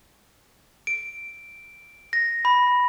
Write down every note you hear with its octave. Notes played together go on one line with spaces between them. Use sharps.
D7
A#6
B5